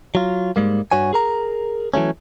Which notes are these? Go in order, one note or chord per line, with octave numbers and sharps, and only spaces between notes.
F#3 F4
G#2 G3 G#3 A#3
G2 F#4 C#5 G#5
G#4 A#4 A#5
E3 F#3 A3 C#4